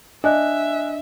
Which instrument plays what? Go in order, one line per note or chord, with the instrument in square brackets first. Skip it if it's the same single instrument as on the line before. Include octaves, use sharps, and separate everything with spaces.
[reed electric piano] D4 [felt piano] D#5 [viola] E5 [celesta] G#5 F#6